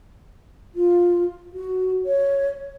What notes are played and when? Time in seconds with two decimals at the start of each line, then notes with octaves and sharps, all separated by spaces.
0.75 F4
1.54 F#4
2.05 C#5